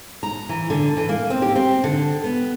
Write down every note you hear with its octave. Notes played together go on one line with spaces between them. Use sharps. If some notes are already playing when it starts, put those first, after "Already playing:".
A#5
E3
D3
E3
A#3
C4
G4
C4
D3
B3